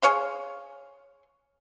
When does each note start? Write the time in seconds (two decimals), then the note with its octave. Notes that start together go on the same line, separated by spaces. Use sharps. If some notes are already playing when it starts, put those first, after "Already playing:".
0.02 G#4 C#5 F5 C6